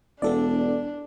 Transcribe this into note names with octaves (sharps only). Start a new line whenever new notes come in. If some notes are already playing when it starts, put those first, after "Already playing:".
E1 B3 D4 A4 D5